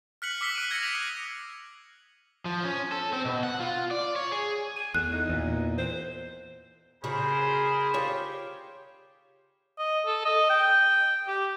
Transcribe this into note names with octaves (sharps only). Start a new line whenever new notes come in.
F6 F#6 B6 C#7 F#7
D6 E6 B6 C7 G7
F#6 D7 D#7
F#6 G#6 A#6 C#7
B6 F7
D#6 F#6
F3
C#4
A4
C4
B2
F#5
F4
D5
C#5
G#4
G#5
E2 A3 F#6
D#4
E2 A#2
C5
C#3 F#4 G#4 A#4 C5 B5
F4 G4 C#5
D#5
A4
D#5
G5
G4